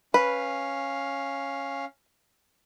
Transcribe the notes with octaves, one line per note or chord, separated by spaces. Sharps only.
C#4 B4 F5